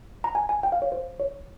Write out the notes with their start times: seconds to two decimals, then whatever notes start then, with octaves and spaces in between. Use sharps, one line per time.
0.24 A#5
0.35 G#5
0.49 G#5
0.63 G5
0.72 F5
0.82 C#5
0.92 C5
1.20 C#5